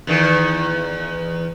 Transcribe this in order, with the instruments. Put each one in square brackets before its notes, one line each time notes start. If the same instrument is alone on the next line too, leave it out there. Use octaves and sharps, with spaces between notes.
[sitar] E2 D#3